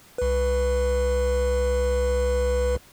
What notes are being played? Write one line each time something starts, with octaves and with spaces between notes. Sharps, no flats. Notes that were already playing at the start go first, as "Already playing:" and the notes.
C2 B4